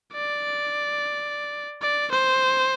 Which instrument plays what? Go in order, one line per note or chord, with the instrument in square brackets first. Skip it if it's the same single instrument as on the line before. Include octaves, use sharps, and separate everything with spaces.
[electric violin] D5
D5
C5